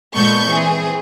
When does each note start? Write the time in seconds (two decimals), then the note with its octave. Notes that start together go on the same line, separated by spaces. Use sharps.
0.15 A#2 G#3 B3 A4 C#6 G6
0.48 E3 C4 G#4